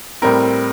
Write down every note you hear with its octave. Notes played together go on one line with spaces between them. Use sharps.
A2 G3 C4 A#4